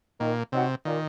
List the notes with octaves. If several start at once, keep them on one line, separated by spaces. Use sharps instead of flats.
A#2 D#3
C3 F#3 C4 D#4 F#4
A#2 D#3